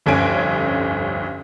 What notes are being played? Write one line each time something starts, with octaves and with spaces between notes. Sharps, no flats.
F1 D2 G2 C#4 G#5 D7